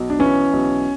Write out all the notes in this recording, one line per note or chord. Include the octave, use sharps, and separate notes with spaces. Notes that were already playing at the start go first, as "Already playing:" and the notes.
Already playing: B1
D4
E3 C#4
B1